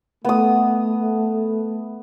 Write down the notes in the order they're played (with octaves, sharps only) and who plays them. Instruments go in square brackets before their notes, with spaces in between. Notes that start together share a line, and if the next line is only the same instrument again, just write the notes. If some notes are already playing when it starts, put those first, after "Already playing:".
[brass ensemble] A3 [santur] B3 D#6